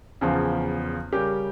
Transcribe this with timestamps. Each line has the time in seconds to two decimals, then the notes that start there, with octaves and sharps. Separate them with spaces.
0.21 E2 C#3 F3
1.13 C#3 G3 C#4 G4 A#4